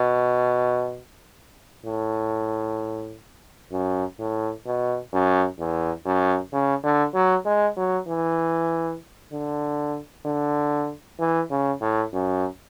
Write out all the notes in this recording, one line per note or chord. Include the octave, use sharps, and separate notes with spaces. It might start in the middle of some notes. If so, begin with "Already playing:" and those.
Already playing: B2
A2
F#2
A2
B2
F#2
E2
F#2
C#3
D3
F#3
G#3
F#3
E3
D3
D3
E3
C#3
A2
F#2